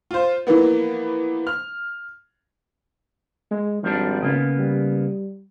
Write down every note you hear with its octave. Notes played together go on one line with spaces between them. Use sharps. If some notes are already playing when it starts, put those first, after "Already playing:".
F4 C5
E3 F3 A#3 B3
F6
G#3
G#1 F3 G3 D4
C#3 A#3 B3
G3